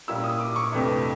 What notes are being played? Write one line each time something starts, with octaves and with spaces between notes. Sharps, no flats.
A#2 G3 A#3 C#4 E4 E6
D#6
D6
C#6
F2 C3 E3 A3 D4